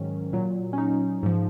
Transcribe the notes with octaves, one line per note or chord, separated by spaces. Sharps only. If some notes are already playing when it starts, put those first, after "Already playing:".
Already playing: G#2 D#3 F#3 C#4
A#2 F#3
C#4
D#4
G#2 F3